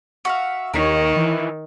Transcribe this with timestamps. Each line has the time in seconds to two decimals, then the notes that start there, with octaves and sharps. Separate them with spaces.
0.25 F#4 E5 F5
0.74 D#2 D#3 A#4 C#5
1.16 E3